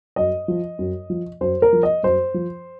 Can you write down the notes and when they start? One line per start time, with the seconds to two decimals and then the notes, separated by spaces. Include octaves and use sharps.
0.16 F#2 D#5
0.48 F3
0.79 F#2
1.10 F3
1.41 F#2 C5
1.62 A#4
1.73 F3
1.83 D#5
2.03 F#2 C5
2.34 F3